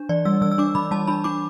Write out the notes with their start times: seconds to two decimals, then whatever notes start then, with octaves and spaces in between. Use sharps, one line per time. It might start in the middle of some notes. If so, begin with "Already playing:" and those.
Already playing: D4
0.09 E3 D5
0.25 G3 E6
0.41 E3 E6
0.52 E6
0.58 D4 D6
0.75 E3 B5
0.91 G3 A5
1.07 D4 B5
1.24 D4 D6